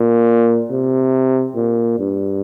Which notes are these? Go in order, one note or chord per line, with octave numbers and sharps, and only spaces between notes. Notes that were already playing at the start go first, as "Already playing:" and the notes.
Already playing: A#2
C3
A#2
G2